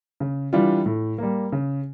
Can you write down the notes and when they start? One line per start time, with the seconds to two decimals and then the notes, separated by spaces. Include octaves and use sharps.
0.20 C#3
0.53 E3 G3 D4 F4
0.86 A2
1.18 G3 A#3
1.52 C#3